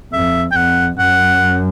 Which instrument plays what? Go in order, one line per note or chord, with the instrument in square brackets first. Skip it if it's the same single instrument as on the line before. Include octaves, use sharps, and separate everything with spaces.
[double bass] F2 [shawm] E5
[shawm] G5
[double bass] F2 [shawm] F#5
[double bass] F#2 [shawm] F#5